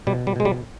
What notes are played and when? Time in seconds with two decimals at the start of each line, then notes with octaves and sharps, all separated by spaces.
0.07 B2 G3
0.27 G3
0.36 B2 G#3
0.45 G3